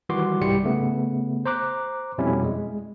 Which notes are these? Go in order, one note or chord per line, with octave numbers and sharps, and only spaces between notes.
D#3 E3 G3 F#4 C6 D6
C2 G#2 G3 E4 G4 C#7
C#3 A3 B3
C5 A#5 D6 F#6
F2 B2 G3 C4 C#4 E4
G#3